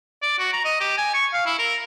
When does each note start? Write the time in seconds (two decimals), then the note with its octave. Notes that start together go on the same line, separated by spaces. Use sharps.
0.22 D5
0.39 F#4
0.53 A#5
0.65 D#5
0.80 G4
0.98 G#5
1.14 C#6
1.33 F5
1.46 E4
1.59 A#4